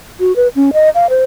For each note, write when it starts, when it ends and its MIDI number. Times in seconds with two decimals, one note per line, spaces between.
0.20 0.35 66
0.36 0.48 71
0.56 0.71 61
0.73 0.90 75
0.95 1.07 77
1.10 1.24 72